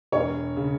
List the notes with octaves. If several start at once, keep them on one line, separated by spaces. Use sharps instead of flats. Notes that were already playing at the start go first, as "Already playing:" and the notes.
E1 C#5
C#3